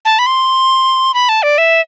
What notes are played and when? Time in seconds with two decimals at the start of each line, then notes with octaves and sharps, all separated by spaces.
0.05 A5
0.19 B5
0.26 C6
1.14 B5
1.29 A5
1.43 D5
1.58 E5